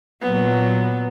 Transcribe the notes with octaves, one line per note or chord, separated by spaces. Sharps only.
A#2 F#3 B3